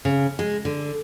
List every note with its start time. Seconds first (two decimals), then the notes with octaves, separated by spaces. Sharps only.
0.05 C#3
0.39 G#3
0.65 D3